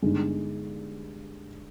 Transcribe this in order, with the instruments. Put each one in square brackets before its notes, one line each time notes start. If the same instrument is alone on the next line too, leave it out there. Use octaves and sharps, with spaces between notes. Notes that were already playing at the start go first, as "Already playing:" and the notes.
[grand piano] G1 G2 D3 G#3 D#4